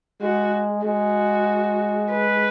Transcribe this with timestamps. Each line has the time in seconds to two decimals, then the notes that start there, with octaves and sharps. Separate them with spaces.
0.21 G#3 F#4
0.85 G#3 F#4
2.12 B4